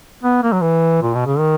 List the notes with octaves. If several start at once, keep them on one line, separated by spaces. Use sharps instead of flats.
B3
A#3
F#3
E3
A#2
B2
C#3
D#3